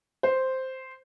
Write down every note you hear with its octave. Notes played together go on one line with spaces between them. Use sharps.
C5